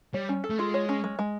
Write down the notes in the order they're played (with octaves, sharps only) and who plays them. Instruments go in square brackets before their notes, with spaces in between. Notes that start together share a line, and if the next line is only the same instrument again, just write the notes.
[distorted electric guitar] G3 [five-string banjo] C#5
[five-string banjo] C#4
A4
[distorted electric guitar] A3
[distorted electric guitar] G#3 [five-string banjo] F4
[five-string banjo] C#5
C#4
G#3
G#3